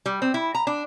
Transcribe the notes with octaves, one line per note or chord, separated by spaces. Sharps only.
G3
C4
E4
A#5
D4